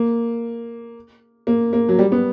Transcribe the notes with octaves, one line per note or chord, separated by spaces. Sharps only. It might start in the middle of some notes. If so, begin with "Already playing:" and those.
Already playing: A#3
A#3
A#3
F#3
G3
B3